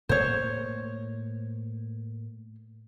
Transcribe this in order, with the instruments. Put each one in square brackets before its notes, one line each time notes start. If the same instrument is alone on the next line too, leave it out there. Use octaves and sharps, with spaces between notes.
[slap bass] A2 A3 A#3 [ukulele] C5 C#5